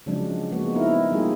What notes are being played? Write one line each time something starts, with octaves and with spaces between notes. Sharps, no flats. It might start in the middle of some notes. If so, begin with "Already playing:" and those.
C#3 F3 F#3 G#3 C4 D4
C#3 F3 G#3 A#3 B3 F#4
B3 C4 D#4 E4 A#4
C4
G3 A#3 D#4 F4 G#4